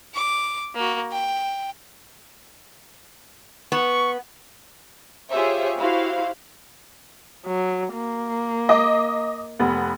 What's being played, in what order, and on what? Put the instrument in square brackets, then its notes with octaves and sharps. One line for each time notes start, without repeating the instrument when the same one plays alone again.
[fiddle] D6
A#3 F#4
G5
[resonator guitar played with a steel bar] B3 [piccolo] C#6
[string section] F4 G4 G#4 C5 C#5 E5
E4 F#4 G4 C5 F5
[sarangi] F#3
A#3
[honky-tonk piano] D#5 D6
F1 B3